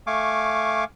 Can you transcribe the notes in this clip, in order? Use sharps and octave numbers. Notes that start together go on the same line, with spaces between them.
A3 F5 G#5 C#6 D6